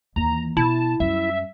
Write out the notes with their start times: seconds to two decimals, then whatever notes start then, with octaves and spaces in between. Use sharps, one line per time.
0.16 D#2 E3 A#5
0.57 B2 E4 A5
1.00 F#2 G3 E5